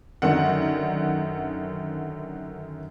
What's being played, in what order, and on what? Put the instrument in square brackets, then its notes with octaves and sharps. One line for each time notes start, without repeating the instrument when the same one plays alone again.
[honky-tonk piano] F#2 D3 D#3 F#5